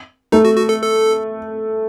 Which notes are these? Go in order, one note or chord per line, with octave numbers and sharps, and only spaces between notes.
A3 D#4
F#4
F#4
A4
A4